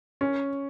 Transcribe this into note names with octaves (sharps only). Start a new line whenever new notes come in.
C#4